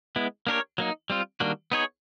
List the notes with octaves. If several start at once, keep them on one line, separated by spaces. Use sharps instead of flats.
G#3 B3 E4
A#3 D4 G4 A#4 C#5
F#3 A#3 D#4
G3 C4 F4
D#3 G3 A#3 D4 F#4
B3 D#4 G#4 C#5